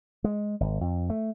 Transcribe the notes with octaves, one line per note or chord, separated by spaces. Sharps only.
G#3
G#1
F2
A3